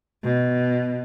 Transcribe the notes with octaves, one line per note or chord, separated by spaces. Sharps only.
B2